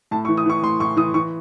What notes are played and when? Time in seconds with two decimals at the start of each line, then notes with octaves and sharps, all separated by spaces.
0.11 A2 A5
0.25 C#6
0.29 E3
0.37 D#6
0.46 E3 C#6
0.63 A2 C6
0.80 A2 C#6
0.97 E3 D#6
1.14 E3 C#6